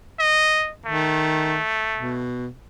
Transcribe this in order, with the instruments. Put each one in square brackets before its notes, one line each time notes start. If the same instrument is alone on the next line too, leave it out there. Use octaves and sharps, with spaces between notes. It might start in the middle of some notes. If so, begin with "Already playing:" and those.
[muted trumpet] D#5
[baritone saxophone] D#3 [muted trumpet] A3
[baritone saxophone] B2